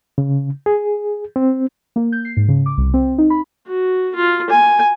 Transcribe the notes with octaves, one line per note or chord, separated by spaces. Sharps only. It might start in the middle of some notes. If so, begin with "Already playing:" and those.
C#3
G#4
C4
A#3
G6
C7
G#2
C#3
D6
C2
C4
D#4
B5
F#4
F4
G#5